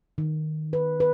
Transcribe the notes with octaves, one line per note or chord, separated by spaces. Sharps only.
D#3
B4
B4